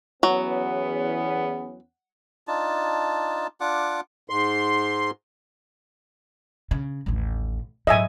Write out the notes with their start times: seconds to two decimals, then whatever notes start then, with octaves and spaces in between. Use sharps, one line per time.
0.23 E2 F#3 B3 C#4
2.48 D4 D#4 F4 A5
3.60 D4 F4 F#5 D6
4.29 G#2 C6
6.71 C#3
7.06 A1 D#2
7.87 G#2 F#3 D#5 E5 G#5